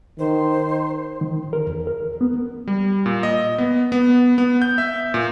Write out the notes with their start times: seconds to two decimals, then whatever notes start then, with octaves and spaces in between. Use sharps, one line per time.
0.19 D#3 C5
1.21 D#3
1.53 A#4
1.67 E2
1.87 A#4
2.21 B3
2.68 G3
3.06 A#2
3.23 D#5
3.58 B3
3.92 B3
4.38 B3
4.62 G6
4.78 E5
5.14 A#2